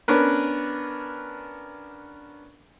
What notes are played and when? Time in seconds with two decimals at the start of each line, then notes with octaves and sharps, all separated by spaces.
0.08 B3 C#4 D4 A#4 B4